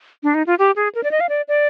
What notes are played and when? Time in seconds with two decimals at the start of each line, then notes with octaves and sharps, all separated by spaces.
0.23 D4
0.34 D#4
0.47 F4
0.59 G4
0.76 G#4
0.95 A#4
1.03 D5
1.11 D#5
1.20 F5
1.29 D5
1.48 D5